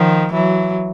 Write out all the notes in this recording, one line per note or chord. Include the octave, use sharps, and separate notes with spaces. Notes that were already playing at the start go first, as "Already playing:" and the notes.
Already playing: D#3 F3
E3 F#3